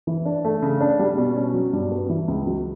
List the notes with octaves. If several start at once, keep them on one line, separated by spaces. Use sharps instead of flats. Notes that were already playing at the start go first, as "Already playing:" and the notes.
E3
D4
A3
C#3
D4
G3
B2
C#4
F#3
G2
B3
E3
C#2
F#3